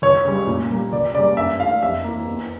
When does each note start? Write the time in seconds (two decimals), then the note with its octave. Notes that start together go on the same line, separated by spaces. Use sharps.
0.02 C#2 C#5
0.25 C#3 G3
0.47 A#2
0.70 G3 A#3
0.92 C#2 D5
1.14 C#3 D5
1.17 G3 A#3
1.37 G2 E5
1.60 E3 A3 F5
1.82 F2 E5
2.04 E3 A#3
2.28 E2